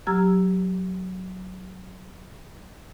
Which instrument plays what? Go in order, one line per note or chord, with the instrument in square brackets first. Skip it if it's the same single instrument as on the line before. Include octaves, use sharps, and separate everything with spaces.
[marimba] F#3 G4 A#5 E6 F6 G#6